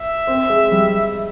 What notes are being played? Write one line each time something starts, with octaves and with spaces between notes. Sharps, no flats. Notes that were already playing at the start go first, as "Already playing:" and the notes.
Already playing: E5
C4
G#3
G3